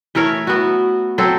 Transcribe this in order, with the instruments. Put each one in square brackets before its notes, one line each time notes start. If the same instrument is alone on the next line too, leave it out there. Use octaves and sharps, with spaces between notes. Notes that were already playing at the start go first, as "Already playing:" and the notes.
[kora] E3 A3 A#4 C#5
B3 F#4
F#3 C4 A4 C5